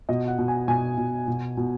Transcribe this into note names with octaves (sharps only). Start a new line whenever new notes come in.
B2 D#5
F#5
B2
G#5
B2 G#5
B2
B2
B2